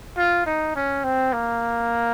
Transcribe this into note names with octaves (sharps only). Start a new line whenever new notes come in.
F4
D#4
C#4
C4
A#3